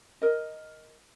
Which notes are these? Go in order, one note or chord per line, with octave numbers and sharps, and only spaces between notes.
A#4 D#5